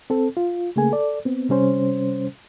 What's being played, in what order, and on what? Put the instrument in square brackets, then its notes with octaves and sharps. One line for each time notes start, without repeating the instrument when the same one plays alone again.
[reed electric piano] C4 A4
F4
C#3 A3 A#3 G#4 G#5
A4 D5
B3 C4
C3 G3 C#4 C5